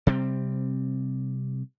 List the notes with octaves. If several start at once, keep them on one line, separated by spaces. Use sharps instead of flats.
C3 G3 C4